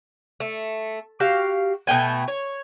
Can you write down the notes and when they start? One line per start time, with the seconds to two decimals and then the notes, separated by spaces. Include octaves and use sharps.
0.40 A3
1.20 F#4 G4 F5
1.87 B2 A3 G5 G#5
2.28 C#5